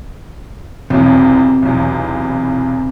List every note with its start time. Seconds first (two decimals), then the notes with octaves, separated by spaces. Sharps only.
0.90 B1 E2 C3
1.62 B1 E2